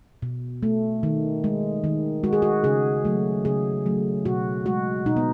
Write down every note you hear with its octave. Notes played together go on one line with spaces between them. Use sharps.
B2
A3
D#3
G#3
D#3
G#3 F#4
G#4
F#4
C#3 G#4
F#3 A3
C#3 G#4
F#3 A3
B2 F#4
G#3 F#4
B2 D#4
B3